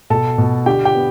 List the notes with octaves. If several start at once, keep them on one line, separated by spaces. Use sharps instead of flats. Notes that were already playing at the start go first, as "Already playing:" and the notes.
B2 A4 A5
B2
D3 G4 G5
G4 G5
B3